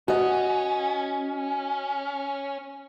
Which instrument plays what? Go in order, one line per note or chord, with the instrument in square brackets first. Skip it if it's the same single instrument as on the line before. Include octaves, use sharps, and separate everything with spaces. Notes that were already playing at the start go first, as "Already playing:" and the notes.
[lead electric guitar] C#4 [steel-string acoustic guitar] F#4 D#5